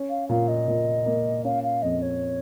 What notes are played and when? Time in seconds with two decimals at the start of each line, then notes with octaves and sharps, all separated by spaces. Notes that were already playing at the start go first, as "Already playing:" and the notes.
Already playing: C#4
0.10 F5
0.29 A#2 F5
0.48 D#5
0.68 A#2
1.06 A#3
1.45 C#4 F5
1.63 F5
1.82 F2 D#5
2.02 C#5